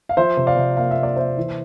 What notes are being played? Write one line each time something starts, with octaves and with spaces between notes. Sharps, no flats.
F5
F3 C5 E5
C3
D5 F5
C3
A#3 F5
E5
A#3
D5
A#3 C5 E5
E3